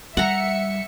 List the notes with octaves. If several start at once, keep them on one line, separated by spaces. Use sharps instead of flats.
G3 E5 F#5 A#5 C#7